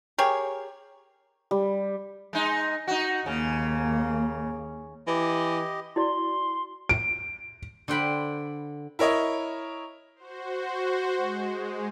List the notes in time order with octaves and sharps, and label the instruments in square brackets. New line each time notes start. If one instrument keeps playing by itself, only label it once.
[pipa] G4 G#4 A#4 C#5
[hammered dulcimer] G3
[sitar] G#3 D#4
D#4 F#4
[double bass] D#2 A#3 [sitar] C#3
[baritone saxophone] E3 [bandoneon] G4 D#5
[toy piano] E4 F#4 D5 [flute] C6
[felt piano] D7
[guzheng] D3 C5 G5 B5
[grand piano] E4 A#4 C#5 D#5
[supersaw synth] F#4 C5
G#3